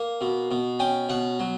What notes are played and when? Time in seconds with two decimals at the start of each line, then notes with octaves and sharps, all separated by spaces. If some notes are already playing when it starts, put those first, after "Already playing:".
Already playing: A#3
0.21 B2
0.51 B2
0.79 C#4 G5
1.09 B2 F#5
1.39 F#3